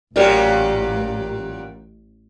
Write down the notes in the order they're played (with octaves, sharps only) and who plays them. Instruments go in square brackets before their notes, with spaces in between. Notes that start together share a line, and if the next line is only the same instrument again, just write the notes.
[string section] A1 [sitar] A#2 F#3 G3 [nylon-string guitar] G4 A#4 D5